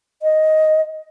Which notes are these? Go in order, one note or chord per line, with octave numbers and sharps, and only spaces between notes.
D#5